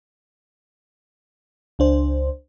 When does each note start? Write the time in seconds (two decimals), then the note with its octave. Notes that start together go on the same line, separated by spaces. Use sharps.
1.79 C#2 D4 C5